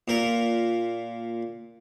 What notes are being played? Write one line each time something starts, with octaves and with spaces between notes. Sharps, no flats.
A#2 A#4